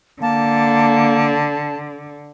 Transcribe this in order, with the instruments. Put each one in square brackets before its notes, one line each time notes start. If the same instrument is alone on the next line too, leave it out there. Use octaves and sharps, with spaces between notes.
[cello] D3 [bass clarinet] A#3 [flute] A5